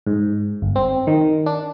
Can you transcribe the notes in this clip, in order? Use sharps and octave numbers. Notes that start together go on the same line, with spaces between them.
G#2
G1
C4
D#3
D4